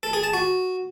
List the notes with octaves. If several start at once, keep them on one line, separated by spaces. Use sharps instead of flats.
A4
G#4
A5
F#4